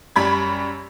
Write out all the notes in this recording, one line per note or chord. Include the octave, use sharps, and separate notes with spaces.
F#2 G3 B5 G#6